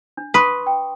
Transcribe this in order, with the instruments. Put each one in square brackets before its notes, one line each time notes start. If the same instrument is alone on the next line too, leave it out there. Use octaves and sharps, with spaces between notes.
[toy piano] D4
[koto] B4 [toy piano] C6 C#6 D#6
[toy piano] G5